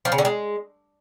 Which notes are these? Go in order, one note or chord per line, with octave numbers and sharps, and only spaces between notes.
F3
C#3
D3
G#3